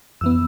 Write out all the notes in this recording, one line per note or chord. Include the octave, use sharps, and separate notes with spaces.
F2 E3 B3 E6